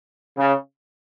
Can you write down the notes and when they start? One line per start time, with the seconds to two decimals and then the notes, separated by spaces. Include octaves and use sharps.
0.37 C#3